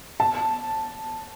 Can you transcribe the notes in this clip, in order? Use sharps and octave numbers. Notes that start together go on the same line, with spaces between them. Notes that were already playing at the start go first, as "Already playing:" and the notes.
A5